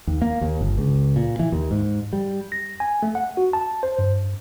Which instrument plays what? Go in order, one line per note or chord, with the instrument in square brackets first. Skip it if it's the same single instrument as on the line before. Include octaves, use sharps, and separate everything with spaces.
[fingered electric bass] D#2
A#3
D#2
G1
C#2
A#2
E3
D#2
G#2
G3
[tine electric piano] A#6
G#5
A3
F#5
F#4
A5
C5
G2